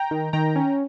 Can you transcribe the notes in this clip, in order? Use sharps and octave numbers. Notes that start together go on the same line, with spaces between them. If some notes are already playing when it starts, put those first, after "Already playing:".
Already playing: G5 A#5
D#3
D#3 G5 A#5
C#4